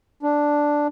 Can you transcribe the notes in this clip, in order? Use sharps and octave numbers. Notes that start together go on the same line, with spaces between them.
D4